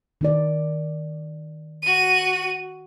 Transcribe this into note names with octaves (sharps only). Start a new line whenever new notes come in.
D#3 D#4 D5
F#4 D#7